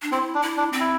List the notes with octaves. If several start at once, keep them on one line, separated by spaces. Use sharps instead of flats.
D4
C4 E4
D4
E4
D4
C4
E4